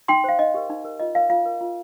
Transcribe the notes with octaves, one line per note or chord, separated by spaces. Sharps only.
D#4 G5 C6
C5 F5
D#4 D#5
G4 A#4
D#4
A#4
F4 D#5
A#4 F5
F4 F5
A#4
F4